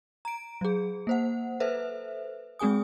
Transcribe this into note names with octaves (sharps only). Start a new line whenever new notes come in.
A#5 D7
F#3 G#4
A#3 C5 F#5
A4 B4 C5 E5
G#3 C4 G#4 G#5 D#6